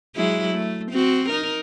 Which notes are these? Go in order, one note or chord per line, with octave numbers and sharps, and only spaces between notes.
F#3 G#3 E4
A3
C4 F#4
D#4 A#4